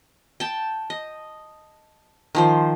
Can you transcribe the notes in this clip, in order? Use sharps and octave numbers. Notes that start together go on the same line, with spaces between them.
G5 A5
D#5
D#3 F3 C5